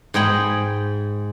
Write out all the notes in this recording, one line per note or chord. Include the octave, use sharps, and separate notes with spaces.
G#2 G#4 G5 B5